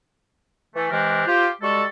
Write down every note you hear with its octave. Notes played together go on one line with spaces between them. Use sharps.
E3 A3
C3 E3 G#3 D4 G4 A#4
F4 G4 C5
G3 G#3 F#4 A4